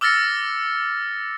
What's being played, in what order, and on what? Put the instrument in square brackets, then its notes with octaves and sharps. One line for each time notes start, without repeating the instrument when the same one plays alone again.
[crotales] D6 E6 F6 A6 A#6 C#7